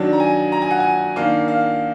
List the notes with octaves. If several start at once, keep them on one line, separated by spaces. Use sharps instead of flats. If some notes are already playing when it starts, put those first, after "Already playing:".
Already playing: D#3 F#3 D4
A#5
G#5
A#5
G#5
F#5
G#5
D#3 A#3 D4 F5
F5